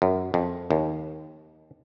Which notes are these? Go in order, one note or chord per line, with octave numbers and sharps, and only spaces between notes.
F#2
F2
D#2